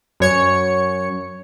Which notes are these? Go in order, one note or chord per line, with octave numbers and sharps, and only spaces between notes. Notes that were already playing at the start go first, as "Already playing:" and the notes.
F#2 C#5 C#7